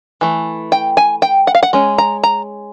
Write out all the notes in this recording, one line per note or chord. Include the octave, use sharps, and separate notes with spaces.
E3 A3
G5
G#5
G5
F#5
F5
F#5
G#3 C#4
A#5
A#5